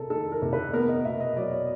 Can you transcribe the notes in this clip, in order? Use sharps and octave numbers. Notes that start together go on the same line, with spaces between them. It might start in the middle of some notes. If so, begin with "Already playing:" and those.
Already playing: C3 A4 A#4
D#3 A4
A#4
C3
B4
B3 A#4
D#5
B2 E5
D#5
F#3 D5
C#5